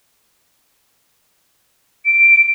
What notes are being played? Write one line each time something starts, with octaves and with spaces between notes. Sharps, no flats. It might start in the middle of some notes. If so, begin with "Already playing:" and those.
D7